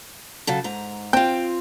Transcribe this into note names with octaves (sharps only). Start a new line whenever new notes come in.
C#3 F#3 A4
G#2 A#5
C4 F4 G5